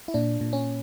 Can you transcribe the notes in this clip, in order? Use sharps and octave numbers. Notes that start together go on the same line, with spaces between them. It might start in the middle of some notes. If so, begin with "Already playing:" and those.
E4
A#2 D4
A#2
C#4